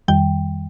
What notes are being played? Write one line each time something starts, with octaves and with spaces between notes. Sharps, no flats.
F2 D#3 G3 G5